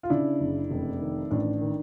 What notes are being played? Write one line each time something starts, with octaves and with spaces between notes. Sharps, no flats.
F4
C#3 D4 E4
F#1
F1
D#3
A1 D4
D#3